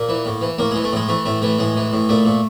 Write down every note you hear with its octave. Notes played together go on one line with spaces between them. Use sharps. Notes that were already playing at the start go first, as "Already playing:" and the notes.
Already playing: A#2 A#3
E3
A2
E3
A2 A#3
E3 G#3
A3
A2 G#3
E3 A3
A2 A3
E3 A3
A2 G#3
E3
A2
A#2 A3
A#2